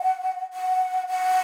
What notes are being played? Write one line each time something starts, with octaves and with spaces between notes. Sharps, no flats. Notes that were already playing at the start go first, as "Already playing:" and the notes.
Already playing: F#5
F#5
F#5